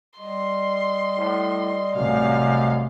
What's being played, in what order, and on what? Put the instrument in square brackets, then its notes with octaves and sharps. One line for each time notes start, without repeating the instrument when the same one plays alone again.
[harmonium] G3 D#5 [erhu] C6
[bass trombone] A2
[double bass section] A1 C3 A3 [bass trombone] F#2 [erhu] F5